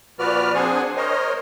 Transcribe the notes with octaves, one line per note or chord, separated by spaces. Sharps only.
A#2 F3 F#4 B4 D5 F6
C4 D4 G#4 C5 F#5 G#5
A#4 C5 C#5 D#5